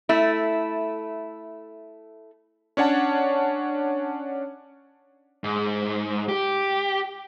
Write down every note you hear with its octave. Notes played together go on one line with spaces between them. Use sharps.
A3 E4
C#4 D4 C#5 F#5 A5
G#2
G4